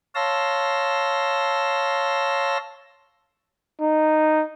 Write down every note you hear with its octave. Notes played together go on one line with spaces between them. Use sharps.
C#5 F5 A5 C6 E6 A#6
D#4